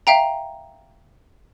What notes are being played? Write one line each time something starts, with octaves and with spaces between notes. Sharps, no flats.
E5 F5 G5 A#5